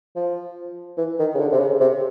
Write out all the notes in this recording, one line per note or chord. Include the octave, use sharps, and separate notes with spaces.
F3
E3
D#3
C#3
D3
C3
C#3
C3